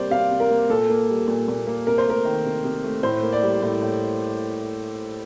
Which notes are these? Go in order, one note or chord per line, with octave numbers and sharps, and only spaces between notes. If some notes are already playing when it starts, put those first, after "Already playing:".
Already playing: C3 G3 A#3 C5 D5
C3 F5
C3
A#4
A#3
A#2 A4
A#3
G3
A#2
A#2
A#3
C3 A#4
C5
A3 A#4
D#3
C3
C3
A3
A2 C5
A#3
D5
G3
A2
A2